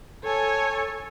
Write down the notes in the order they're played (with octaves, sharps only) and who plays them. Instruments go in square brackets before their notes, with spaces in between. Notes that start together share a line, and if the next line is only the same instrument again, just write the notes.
[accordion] A4 [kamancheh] C#5 G#5